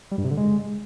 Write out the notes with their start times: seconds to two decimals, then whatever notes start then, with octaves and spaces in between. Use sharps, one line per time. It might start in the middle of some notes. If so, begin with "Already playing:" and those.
0.12 G3
0.18 G2
0.24 C3
0.31 D3
0.37 G#3